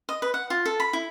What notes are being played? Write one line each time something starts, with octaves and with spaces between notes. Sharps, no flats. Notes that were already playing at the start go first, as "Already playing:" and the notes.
D#5
B4
F#5
F4
A4
B5
E4